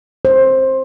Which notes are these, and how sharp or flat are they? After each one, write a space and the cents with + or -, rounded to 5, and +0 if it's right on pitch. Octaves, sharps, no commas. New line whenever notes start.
C5 +15